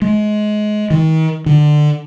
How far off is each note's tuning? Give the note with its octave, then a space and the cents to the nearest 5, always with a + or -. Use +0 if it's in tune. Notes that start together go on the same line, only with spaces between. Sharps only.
G#3 +25
D#3 +35
D3 +20